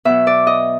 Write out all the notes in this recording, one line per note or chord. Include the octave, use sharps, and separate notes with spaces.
B2 F#3 E5
D5
D#5